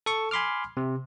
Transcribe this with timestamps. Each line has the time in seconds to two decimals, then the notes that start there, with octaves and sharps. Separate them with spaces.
0.06 A4 C#6
0.31 G#5 B5 C6 D6 F6
0.77 C3